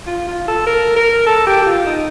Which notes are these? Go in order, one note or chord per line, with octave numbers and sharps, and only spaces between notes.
F4
F4
A4
A#4
A#4
A4
G4
G4
F4
D#4